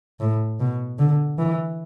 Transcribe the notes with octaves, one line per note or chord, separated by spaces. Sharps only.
A2
B2
D3
E3